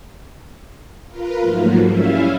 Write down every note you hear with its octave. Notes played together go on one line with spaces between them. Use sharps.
F4 A#4 B4
G#2 F3 F#3 A3 A#3
G3 C#4 E4 E5 F5